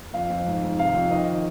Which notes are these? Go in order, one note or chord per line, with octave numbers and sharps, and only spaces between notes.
F2 F5
F2
G#2
G#2
C3 F5
F2
D#3 D#5